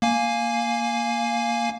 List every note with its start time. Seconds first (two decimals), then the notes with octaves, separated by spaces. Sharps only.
0.02 A#3 F5 G#5